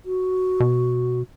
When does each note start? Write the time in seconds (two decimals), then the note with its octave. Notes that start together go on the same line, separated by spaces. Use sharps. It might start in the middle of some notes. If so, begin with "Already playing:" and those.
0.05 F#4
0.60 B2